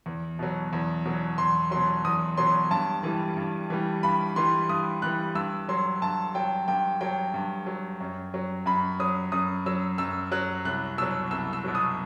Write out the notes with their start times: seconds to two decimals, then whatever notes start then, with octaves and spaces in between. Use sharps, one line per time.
0.06 E2
0.39 B2 F#3
0.73 E2
1.06 B2 F#3
1.38 E2 C6
1.71 B2 F#3 C6
2.05 E2 D#6
2.37 B2 F#3 C6
2.71 G2 A5
3.03 E3 G3
3.37 G2
3.70 E3 G3
4.03 G2 B5
4.36 E3 G3 C6
4.69 G2 D#6
5.02 E3 G3 F#6
5.35 G2 E6
5.69 F#3 C6
6.02 G2 A5
6.35 F#3 G5
6.68 G2 G5
7.01 F#3 G5
7.34 G2
7.67 F#3
8.00 F#2
8.34 F#3
8.66 F#2 B5
9.00 F#3 D#6
9.32 F#2 D#6
9.66 F#3 E6
9.98 F#2 E6
10.32 F#3 F#6
10.65 C2 F#6
10.98 B2 F#3 E6
11.31 C2 E6
11.53 E6
11.64 B2 F#3
11.75 D#6